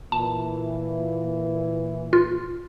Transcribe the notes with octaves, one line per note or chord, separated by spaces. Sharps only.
A#2 E3 A5
F4